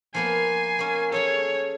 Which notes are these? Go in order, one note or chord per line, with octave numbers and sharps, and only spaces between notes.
F3 A#3 B3 G#5 C7
A#3 C#4
C#4 G#4 A4 C#5